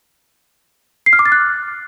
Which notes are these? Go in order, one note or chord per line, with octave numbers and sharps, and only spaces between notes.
C7
F6
D6
A6
F#6